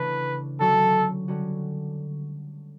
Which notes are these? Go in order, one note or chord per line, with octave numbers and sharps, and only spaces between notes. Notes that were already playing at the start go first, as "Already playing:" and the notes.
Already playing: C#3 E3 A3 D4 B4
D3 F#3 C#4 F#4 A4
D3 G3 C#4 F#4